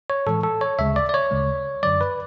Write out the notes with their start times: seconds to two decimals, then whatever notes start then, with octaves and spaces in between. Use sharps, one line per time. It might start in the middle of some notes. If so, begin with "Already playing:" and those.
0.10 C#5
0.27 A2 E3 G#3 A4
0.44 A4
0.61 C#5
0.79 D2 C#3 G#3 E5
0.96 D5
1.09 D5
1.14 C#5
1.31 D2 C#3 G#3
1.83 F#2 D3 F#3 D5
2.01 B4